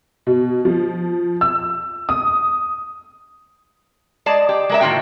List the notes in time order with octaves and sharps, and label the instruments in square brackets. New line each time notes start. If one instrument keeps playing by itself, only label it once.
[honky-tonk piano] B2
F3
E6
D#6
[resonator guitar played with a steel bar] G#3 D5 A5
G4
G#3 A#4 E5
A2 D#3 A#3 F4 F#4 G5